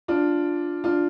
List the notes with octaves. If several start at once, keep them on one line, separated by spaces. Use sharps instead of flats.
D4 F4
D4 F4